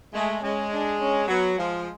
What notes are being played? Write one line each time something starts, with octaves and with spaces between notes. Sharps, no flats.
G#3 A3
G#3 C#4
D4
C#4
F#3 B3
F3 G#3